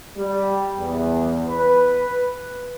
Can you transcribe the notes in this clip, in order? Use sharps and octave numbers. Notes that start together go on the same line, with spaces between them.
G3
E2
B4